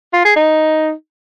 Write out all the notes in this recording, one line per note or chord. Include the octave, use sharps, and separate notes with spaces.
F4
G#4
D#4